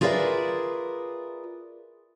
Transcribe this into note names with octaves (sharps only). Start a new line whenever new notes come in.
F4 G#4 A#4 B4 D5 E5